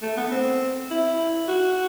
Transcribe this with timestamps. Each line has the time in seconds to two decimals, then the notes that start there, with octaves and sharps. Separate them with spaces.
0.02 A3
0.17 B3
0.32 C4
0.91 E4
1.48 F#4